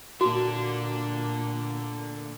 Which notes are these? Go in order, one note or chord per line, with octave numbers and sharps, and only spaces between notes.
A#2 D3 A#3 D4 F#4